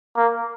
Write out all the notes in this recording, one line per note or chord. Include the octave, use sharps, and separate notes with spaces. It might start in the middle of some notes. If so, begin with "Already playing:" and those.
A#3